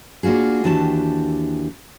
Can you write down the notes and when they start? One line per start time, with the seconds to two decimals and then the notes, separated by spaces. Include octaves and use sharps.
0.23 A#3 D4 F4 F#4 G#4
0.64 D#2 E3 D4 F#4 G4 A5